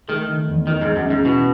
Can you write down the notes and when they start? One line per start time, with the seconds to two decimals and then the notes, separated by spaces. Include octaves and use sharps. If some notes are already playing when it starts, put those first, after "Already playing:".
0.08 D#3 A3
0.29 D#3
0.48 E2
0.67 D#3 D#4
0.81 G#2
0.86 G#3
0.96 F#2
1.06 G#2 C#3
1.25 B2 E4